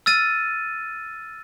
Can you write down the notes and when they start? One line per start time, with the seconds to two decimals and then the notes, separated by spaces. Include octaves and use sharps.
0.06 E6 F6 A6 D#7